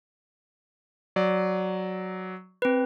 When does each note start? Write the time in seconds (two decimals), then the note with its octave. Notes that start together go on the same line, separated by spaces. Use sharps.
1.16 F#3 D5
2.62 C4 B4